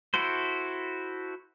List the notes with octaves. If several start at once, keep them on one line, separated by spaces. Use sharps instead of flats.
E4 F#4 A4 C5